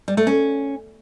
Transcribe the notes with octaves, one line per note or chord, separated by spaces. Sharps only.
G3
A3
C#4